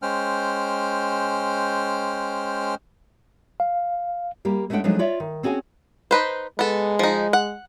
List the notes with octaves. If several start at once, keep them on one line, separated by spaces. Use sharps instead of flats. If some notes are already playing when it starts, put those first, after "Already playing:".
G#3 C#4 C5 G5 F6
F5
G3 A#3 G4
G#3 A3 C#4 D4 F#5 G5
F3 F#3 G#3 A3 D4 D#4
F4 C#5 D5 E5
D#3
C4 C#4 F#4 G#4 G#5
D#4 B4 C5
G#3 B3 A4
F3 D#4
F#5